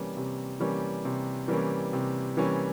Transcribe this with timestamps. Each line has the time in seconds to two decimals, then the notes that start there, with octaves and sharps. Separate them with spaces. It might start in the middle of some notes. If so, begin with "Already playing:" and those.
Already playing: C3 E3 G3 A#3 C#4
0.17 C3
0.60 E3 G3 A#3 C#4
1.05 C3
1.48 E3 G3 A#3 C#4
1.93 C3
2.37 E3 G3 A#3 C#4